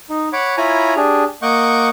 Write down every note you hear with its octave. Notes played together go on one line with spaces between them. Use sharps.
D#4
C#5 F#5 B5 D6
E4 F4 C#5 G#5 A#5 B5
D4 G4 G#4
A#3 D#5 F#5 C#6 D6 G6